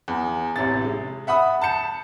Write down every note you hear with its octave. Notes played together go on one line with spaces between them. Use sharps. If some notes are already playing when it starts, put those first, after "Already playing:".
E2
A1 C3 A6
G#3
E5 F#5 B5 D#6
A5 G6 C#7 E7